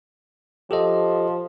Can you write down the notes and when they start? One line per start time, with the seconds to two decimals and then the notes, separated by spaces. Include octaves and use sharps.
0.71 F3 G4 A4 D#5